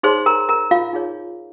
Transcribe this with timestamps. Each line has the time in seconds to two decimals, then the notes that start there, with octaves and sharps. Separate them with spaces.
0.03 D#4 G#4 C5 C#5 C6
0.26 A#4 A#5
0.49 A#4 A#5
0.71 F4 F5
0.93 D#4 G#4 C#5